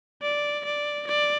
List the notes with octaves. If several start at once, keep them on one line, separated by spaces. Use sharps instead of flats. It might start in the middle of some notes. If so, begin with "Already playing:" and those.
D5
D5
D5